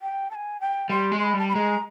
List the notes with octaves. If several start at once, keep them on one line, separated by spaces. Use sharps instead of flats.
G5
A5
G#5
G5
G3 C6
G#3
C6
B5
G3
A5
B5
G#3 A#5